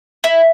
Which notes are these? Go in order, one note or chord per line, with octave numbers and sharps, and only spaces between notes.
E4